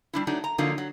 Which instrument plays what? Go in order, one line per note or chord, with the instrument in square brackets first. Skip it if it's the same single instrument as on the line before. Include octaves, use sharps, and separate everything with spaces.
[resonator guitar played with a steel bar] G3 D4 E4
F#3 A3 D4 D#4
A#5
D3 F3 F#3 A#3 D#4 F4
F#3